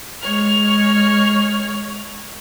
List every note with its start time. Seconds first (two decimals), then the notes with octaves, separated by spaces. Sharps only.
0.21 G#3 C#5 F6